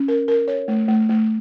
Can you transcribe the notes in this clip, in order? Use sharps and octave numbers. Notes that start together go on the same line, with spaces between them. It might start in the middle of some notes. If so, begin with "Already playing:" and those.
Already playing: C#4
A#4
A#4
C#5
A3
A3
A3